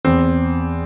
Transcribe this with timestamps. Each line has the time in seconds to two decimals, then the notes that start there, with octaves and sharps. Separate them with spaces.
0.05 E2 C4